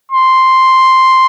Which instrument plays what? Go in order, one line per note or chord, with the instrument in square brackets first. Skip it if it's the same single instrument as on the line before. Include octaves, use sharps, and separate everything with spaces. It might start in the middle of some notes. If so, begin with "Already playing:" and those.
[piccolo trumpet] C6